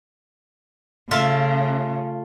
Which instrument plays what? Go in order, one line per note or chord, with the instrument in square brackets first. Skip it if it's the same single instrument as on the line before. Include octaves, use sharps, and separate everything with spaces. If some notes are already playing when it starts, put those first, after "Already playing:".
[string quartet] C#3 [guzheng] A3 F4 E5